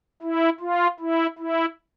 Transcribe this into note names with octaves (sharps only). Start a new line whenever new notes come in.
E4
F4
E4
E4